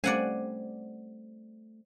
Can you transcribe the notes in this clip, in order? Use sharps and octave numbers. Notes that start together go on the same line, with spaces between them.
G3 A3 C4 C#4 C5 D5 F#5 G#5